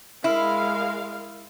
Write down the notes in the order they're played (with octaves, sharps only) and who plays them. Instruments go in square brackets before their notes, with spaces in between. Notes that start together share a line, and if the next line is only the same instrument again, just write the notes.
[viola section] G#3 A#4 F5 [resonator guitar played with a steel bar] E4